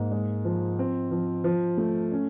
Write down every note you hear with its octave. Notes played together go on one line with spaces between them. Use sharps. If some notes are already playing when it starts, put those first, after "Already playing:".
Already playing: G#2 A#3
G#3
F3
C4
F3
F3
A3
C#4